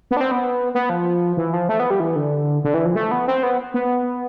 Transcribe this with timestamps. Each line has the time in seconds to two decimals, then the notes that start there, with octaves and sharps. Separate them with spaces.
0.11 B3
0.17 D4
0.21 C4
0.31 B3
0.75 B3
0.89 F3
1.37 E3
1.54 F3
1.69 A3
1.80 B3
1.90 G3
2.00 E3
2.16 D3
2.64 D3
2.74 E3
2.85 F3
2.96 A3
3.11 B3
3.28 C4
3.43 B3
3.74 B3